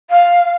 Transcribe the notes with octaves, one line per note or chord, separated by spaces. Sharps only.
F5